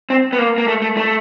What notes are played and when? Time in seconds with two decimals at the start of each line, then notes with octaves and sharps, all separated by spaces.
0.10 C4
0.33 B3
0.38 A#3
0.58 A#3
0.68 A3
0.82 A3
0.97 A3